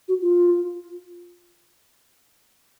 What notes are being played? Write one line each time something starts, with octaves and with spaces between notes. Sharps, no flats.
F#4
F4